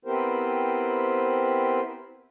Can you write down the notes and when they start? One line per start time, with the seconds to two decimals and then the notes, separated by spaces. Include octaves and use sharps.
0.05 B3 C4 E4 G4 A#4 C5